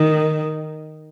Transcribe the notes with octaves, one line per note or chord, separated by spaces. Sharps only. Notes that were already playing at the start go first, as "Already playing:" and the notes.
Already playing: D#3